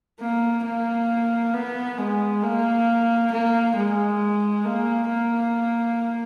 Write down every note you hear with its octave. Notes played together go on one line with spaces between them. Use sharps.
A#3
A#3
B3
G#3
A#3
A#3
G#3
A#3
A#3